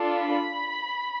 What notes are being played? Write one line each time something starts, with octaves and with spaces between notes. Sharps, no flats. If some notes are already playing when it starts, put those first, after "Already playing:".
Already playing: D4 F4 A4
B5